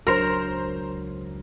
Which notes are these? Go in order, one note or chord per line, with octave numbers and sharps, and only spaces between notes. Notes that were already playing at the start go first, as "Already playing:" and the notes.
C#2 F#3 D4 A#4 C5 A#5